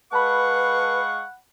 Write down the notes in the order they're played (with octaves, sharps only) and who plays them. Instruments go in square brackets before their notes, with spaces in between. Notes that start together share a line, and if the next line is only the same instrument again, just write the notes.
[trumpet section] G#3 F5 C#6 [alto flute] B4 [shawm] F#5 [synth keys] A5 B5